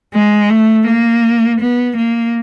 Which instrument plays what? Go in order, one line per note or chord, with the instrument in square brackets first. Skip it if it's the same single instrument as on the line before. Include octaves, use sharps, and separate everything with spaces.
[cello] G#3
A3
A#3
B3
A#3